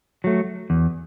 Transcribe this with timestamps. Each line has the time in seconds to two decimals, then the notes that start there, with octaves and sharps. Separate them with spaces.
0.24 F#3 A3
0.70 E2